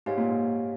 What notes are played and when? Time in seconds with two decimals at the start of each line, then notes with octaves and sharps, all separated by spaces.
0.06 G#2 G4 C#5 F5 G#5
0.18 A#2
0.28 G#2